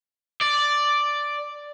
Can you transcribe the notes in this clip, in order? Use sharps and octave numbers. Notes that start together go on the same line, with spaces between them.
D5